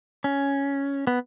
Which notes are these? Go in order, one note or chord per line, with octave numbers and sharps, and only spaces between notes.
C#4
B3